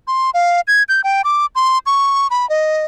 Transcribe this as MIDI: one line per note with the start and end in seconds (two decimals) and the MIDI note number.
0.07 0.30 84
0.34 0.61 77
0.68 0.83 92
0.89 1.01 91
1.04 1.22 79
1.24 1.46 86
1.55 1.78 84
1.86 2.27 85
2.30 2.48 83
2.50 2.85 75